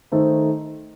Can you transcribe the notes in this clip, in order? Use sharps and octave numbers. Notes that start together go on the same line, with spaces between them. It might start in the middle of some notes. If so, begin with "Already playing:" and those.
D#3 A3 D#4 A4 C5